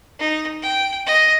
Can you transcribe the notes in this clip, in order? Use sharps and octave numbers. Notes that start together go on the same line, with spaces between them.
D#4
G5
D#5